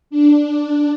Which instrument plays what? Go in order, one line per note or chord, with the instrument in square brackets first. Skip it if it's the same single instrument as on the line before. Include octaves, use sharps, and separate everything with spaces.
[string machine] D4